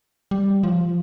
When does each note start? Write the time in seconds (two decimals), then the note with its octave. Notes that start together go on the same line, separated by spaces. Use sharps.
0.31 G3
0.63 F3